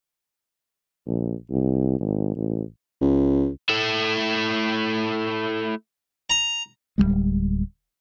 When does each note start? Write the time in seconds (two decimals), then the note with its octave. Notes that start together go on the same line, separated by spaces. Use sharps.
1.07 A#1
1.50 C2
2.00 G#1
2.37 A1
3.01 C#2
3.70 A3 E4
6.30 A#5
6.98 D1 E2 G3 G#3